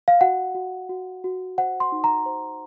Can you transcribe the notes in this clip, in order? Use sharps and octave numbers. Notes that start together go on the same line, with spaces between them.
F5
F#4 F#5
F#4
F#4
F#4
C5 F#5
C6
D#4
A#5
C5